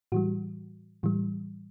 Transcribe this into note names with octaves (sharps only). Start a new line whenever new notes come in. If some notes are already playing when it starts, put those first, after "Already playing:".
A2 E3 G3 F#4
A2 E3 G3